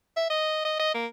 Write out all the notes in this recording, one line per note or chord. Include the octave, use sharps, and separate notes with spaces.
E5
D#5
D#5
D#5
A#3